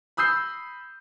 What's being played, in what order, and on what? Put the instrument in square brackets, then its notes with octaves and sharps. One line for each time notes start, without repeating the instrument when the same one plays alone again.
[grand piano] B5 D#6 E6 G6 C7